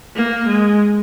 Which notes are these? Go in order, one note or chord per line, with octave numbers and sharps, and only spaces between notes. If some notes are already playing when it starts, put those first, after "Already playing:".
A#3
G#3